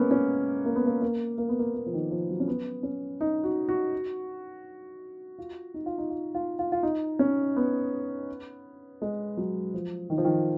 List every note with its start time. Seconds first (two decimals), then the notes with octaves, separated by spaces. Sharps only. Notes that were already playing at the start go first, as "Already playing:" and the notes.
Already playing: G#3 A#3 B3 C#4
0.11 C#4
0.66 A#3
0.76 B3
0.86 A#3
1.01 A#3
1.38 A#3
1.49 B3
1.59 A#3
1.75 A#3
1.86 F3
1.93 D#3
2.11 F3
2.30 F#3
2.40 C#4
2.47 B3
2.83 C#4
3.21 D#4
3.44 F#4
3.69 F#4
5.38 F4
5.74 D#4
5.86 F4
5.98 D#4
6.10 F4
6.35 F4
6.59 F4
6.72 F4
6.83 D#4
7.19 C#4
7.56 B3
9.02 G#3
9.37 F#3
9.74 F3
10.10 D#3
10.18 F3
10.25 D#3